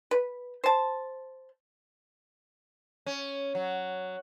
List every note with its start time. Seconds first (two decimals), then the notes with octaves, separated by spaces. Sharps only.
0.11 B4
0.64 C5 A5
3.06 C#4
3.55 F#3